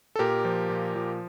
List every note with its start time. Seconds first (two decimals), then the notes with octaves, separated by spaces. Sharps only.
0.16 A4
0.19 A#2 G4 A#4
0.45 F3
0.70 A#2
0.96 F3